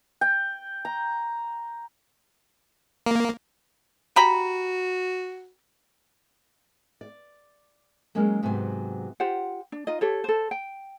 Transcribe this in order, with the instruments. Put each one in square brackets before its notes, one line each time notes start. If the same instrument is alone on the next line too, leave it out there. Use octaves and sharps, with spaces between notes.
[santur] G5
A#5
[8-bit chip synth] A#3
[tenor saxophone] F#4 [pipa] G4 A#5 B5
[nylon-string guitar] D5
F#3 G#3 A#3 C#4 G#4 A#4
G#2 C3 F#3 B3 G#5
[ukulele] F4 G4 C5 F#5
D4
D#4 F4 D#5
G4 A4 C#5
A4 C5
G5